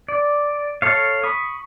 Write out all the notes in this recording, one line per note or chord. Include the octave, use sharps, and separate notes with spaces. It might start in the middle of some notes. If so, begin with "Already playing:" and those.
D5
A4 C#5 F5
B5 C#6 D#6